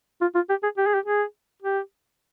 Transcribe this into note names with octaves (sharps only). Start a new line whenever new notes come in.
F4
F4
G4
G#4
G4
G#4
G4
G#4
G4